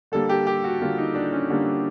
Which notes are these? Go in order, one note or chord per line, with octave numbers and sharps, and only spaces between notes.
D3 G3 A#3 A4
G4
G4
F#4
D3 G3 A#3 F4
D#4
D4
C#4
D3 G3 A#3